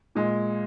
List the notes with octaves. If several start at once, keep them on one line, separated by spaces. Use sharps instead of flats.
A#2 G#3